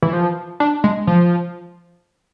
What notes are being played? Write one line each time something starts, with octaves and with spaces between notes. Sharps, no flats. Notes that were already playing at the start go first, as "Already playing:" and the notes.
E3
F3
D4
G#3
F3